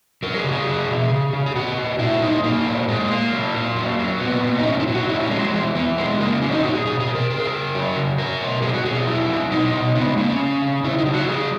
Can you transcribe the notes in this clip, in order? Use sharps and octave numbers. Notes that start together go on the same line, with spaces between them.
F#3 A#4
G#4
C#3 F#4
G#4
F#3
B2
C#3
C#3
G#4
A#2 F#4
A#2
A#2 E4
F#3 D#4
F#3 A#3
A#2
A#2 G#3
A#2 A#3
F#3
A#2
F#3
F#3
A#2 B3
A#2
D#4
A#2 C#4
E4
F#3
F#4
A#2 E4
C#4
F#3 G#3
G#3
E3 G#3
E3 B3
F#3 G#3
C#3 A#3
F#3 C#4
D#4
A#2 F#4
G#4
B2 G#4
G#4
B2
A#4
C#3 A#4
G#4
A#4
C#3
F#3
C#3
F#3 A#4
B2
F#3 G#4
F#4
B2 G#4
F#3 E4
F#3
B2 D#4
B2
C#3 B3
G#3
C#3 A#3
C#4
C#3
C#3
C#3 E4
D#4
F#3
F#4
C#3 G#4